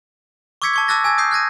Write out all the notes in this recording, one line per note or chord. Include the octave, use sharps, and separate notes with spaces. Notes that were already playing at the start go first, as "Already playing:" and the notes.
C#6 D6 E6 G#6 B6 C#7
A5 C#6 G#6
A5 D6 E6 F#6 A6 A#6
G#5 E6 G#6 A6
D#6 G6 C7
F#6 G#6 A#6 D#7